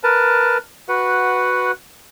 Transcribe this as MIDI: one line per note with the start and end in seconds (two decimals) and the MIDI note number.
0.03 0.58 70
0.03 0.58 71
0.03 0.58 81
0.89 1.72 66
0.89 1.72 71
0.89 1.72 78